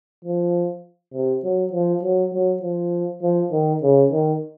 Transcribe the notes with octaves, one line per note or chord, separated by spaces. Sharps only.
F3
C3
F#3
F3
F#3
F#3
F3
F3
D#3
C#3
D#3